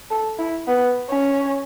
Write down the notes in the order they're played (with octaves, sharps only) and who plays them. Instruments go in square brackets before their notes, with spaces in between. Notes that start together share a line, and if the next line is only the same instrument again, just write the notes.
[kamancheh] A4
E4
B3
C#4